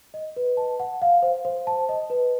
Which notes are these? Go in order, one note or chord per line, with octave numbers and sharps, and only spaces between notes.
D#5
B4
A5
F#5
F5
C5
C5
A5
D#5
B4